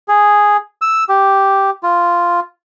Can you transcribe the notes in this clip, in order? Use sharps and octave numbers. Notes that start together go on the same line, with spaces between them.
G#4
E6
G4
F4